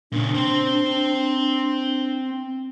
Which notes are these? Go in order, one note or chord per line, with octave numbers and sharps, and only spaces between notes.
A#2 C#3 D4
C4 C5